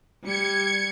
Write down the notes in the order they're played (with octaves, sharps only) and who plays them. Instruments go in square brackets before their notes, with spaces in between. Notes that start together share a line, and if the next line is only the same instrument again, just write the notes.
[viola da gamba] G3 [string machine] G#6 C#7